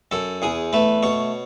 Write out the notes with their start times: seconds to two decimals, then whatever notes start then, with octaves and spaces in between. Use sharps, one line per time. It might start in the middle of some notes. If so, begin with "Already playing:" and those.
0.11 F#2 A4
0.42 E2 G#4
0.73 A3 B4
1.03 B2 C#5